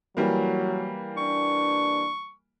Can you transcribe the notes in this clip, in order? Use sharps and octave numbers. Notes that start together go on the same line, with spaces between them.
E3 F#3 G3 A#3
D4 C#6